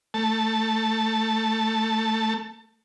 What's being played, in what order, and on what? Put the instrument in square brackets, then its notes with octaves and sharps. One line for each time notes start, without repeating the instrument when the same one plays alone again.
[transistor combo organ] A3 A5